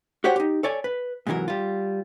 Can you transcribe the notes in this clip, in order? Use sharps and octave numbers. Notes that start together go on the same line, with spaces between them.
F#4 G4 C5 C#5 F#5
D#4 G4
A4 C#5 D5 G#5
B4
G#2 C3 E3 F#3 A#4
G3 F4